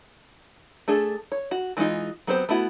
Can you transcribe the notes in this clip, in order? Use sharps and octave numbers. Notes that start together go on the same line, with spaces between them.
A3 D4 G#4 A4
C#5
F#4
E3 G#3 B3 D#4 F4
F#3 B3 C4 G4 C5
A3 B3 E4 F#4